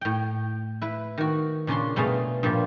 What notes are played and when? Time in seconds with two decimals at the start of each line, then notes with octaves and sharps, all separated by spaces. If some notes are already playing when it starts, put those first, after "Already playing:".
0.01 A2 G5
0.82 E4 B4
1.18 D#3 F#4
1.67 A#2 C#3 C#4 D4 C6
1.96 G2 B2 A3 G#4 F5 A5
2.43 G2 A#2 F3 G3